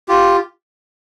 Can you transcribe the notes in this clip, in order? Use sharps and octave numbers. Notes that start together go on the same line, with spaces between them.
F4 G4